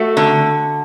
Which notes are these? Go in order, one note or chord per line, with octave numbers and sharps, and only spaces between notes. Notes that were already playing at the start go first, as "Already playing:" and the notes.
Already playing: A3 F#4
D3